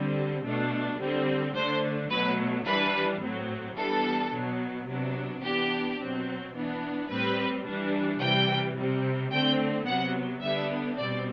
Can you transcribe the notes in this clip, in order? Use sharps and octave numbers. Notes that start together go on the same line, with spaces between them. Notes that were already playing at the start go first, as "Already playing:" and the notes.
Already playing: D3 G3 C4
B2 A3 D4
D3 G3 C4
D3 A3 D4 C5
B2 F#3 A3 B4
E3 G3 D4 B4
A2 F#3 C4
E3 G3 B3 D4 A4
B2 F#3 B3
C3 F#3 B3 D4
E3 B3 D4 G4
B2 F#3 C4
E3 B3 D4
A2 G3 C4 B4
E3 G3 D4
C3 E3 G3 G5
C3 G3 C4
D3 A3 C4 G5
C3 F#3 B3 F#5
D3 G3 B3 D4 E5
B2 G3 C4 D5